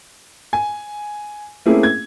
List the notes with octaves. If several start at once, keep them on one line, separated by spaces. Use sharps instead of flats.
G#5
A3 A#3 C4 C#4 E4 G#4
G#6